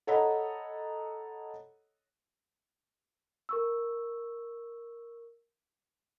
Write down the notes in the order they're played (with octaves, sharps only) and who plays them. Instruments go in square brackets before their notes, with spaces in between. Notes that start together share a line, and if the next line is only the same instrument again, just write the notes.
[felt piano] A4 C#5 D#5 F#5 A#5 B5
[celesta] A#4 C#6 E6